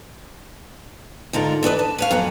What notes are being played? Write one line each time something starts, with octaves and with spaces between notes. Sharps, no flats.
G#2 D3 F4 A#4
E3 D4 B4 D#5
A5
B4 C#5 F5
F2 F#3 B3 C#4